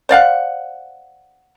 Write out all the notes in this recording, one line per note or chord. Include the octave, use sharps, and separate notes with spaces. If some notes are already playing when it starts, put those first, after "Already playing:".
C5 D5 F5 F#5